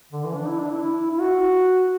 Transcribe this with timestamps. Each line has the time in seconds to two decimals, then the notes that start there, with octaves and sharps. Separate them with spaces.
0.12 D3
0.24 E3
0.36 D4
0.48 E4
0.59 D4
0.71 E4
1.11 E4
1.20 F#4